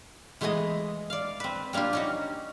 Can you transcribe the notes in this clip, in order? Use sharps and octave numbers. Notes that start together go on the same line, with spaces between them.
E3 G#3 A3 B3 G#4 D#5
D5 F5
C4 B4
G3 A#3 D4 F4 G4
C#4 D#4 F#4